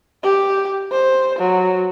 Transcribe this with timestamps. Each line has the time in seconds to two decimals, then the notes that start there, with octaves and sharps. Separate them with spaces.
0.24 G4
0.92 C5
1.39 F#3